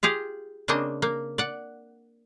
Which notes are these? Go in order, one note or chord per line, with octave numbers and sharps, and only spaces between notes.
F4 G4 G#4 F5
C#3 A#3 C4 D4 D#5
A#3
D5 F#5